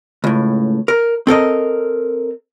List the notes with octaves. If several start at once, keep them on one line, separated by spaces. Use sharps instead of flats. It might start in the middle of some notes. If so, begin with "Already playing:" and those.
C#2 A2
A#4
C4 A4 A#4 D#5